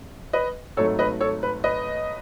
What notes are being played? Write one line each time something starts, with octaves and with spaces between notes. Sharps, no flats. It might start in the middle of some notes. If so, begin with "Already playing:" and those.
Already playing: G#1 F#2
B4 D#5
G#1 G#2 F#3 A3 A4 C#5
B4 D#5
A4 C#5
B4
B4 D#5